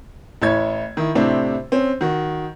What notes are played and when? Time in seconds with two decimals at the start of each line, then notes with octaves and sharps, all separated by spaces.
0.42 A1 E4 C#5 G#6
0.97 D#3 E4
1.15 A2 C3 C4 D4 E4
1.72 C4 C#4
2.01 D#3 F#4